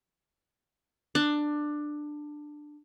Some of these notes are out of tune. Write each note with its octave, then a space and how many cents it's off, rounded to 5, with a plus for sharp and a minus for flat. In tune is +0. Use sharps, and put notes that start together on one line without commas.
D4 +15